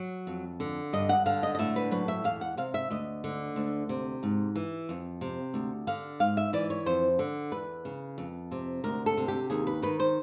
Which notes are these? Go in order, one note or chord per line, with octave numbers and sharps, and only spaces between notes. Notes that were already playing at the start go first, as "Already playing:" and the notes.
Already playing: F#3
F2
D3
G2 D#5
F#5
D3 F5
D#5
D#5
A2 E5
B4
F#3 B4
E5
E2 F5
F#5
C3 F5
E5
D2 D#5
D3
D2
C3
G#2
E3
F2
C3
D2
D3 F5
G#2 F5
E5
E3 D5
C#5
F2 C5
D3
E2 B4
C#3
F2
C3
D2 A#4
A4
C3
G4
D#2 G#4
B4
D#3 B4
C5